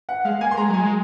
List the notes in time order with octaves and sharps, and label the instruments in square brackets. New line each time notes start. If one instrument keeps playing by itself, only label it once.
[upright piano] F#5
[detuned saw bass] G#3 [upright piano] F5
[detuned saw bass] A#3 [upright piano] G#5
[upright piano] C6
[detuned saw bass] G#3 [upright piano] A#5
[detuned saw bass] F#3 [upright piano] G#5
[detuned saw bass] G#3